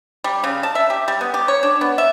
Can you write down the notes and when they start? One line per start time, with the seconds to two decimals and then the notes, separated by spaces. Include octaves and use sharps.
0.24 G3
0.44 C#3
0.63 A5
0.75 E5
0.90 G4
1.08 G3
1.21 B3
1.34 G4
1.48 C#5
1.63 D4
1.81 B3
1.98 E5